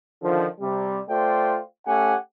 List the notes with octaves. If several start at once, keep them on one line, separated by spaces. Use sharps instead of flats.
D3 D#3 F3
C3 G3
A3 F4 C5 D5 G5
A3 C#4 G4 F#5 G#5